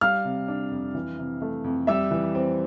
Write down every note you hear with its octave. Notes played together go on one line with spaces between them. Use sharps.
G3 F5 F6
C3
D4
F2
E3
C3
A3
F2
G3 E5 E6
E3
C4